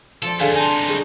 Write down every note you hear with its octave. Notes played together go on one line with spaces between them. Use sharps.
F3 A4 D5
D#2 D3 A3 G#4 F5 G#5
C3 D#4 G#5 A5 C6
G3 G#4 C#5